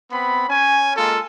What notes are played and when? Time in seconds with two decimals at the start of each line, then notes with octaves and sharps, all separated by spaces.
0.11 B3 C4 B5
0.49 C#4 G#5
0.96 G#3 A#3 F4 A4